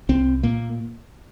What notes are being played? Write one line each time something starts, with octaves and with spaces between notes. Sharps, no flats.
C2 C4
A#2 A#3